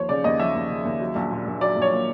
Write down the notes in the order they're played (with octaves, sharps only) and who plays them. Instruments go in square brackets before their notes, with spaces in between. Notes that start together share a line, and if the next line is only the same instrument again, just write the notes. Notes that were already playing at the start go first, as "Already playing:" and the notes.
Already playing: [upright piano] D#2 F3 C5 C#5
C#3 D5
D#2 D#5
F3 E5
D#2
C#3
D#2
F#3
A#1
A#2
A#1
F#3 D5
A#1
C#5
A#2